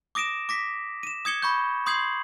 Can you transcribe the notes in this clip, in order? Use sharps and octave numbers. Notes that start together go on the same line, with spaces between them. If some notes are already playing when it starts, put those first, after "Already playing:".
D6 D#6 A#6 D7 E7
D6 A#6 B6
D#7 E7
D#6 G#6 C#7 G7
B5 C#6 G6
C6 D#6 G6 G#6 C7 F#7